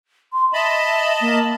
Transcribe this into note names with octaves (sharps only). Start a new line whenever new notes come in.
C6
D#5 E5 A5 B5
A#3